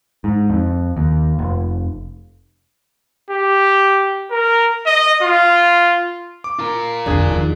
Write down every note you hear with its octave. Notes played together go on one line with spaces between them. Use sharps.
G#2
F2
D#2
F1
G4
A#4
D#5
F4
D6
F4 A#4
F2 D3 D4 G#4
E2 D#3 F3 D#4